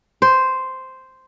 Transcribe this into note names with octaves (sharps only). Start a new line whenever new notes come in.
C5